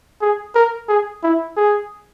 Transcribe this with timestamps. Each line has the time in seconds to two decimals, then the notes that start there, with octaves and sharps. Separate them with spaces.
0.21 G#4
0.55 A#4
0.89 G#4
1.23 E4
1.57 G#4